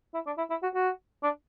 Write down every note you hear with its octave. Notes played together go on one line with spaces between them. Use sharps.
E4
D4
E4
E4
F#4
F#4
D4